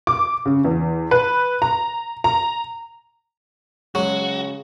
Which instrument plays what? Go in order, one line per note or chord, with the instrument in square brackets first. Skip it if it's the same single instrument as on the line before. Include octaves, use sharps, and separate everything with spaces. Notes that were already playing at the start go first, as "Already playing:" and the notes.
[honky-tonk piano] D6
C#3
E2
B4
A#5
A#5
[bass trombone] C#3 [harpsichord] F#3 [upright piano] G#3 [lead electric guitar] F#4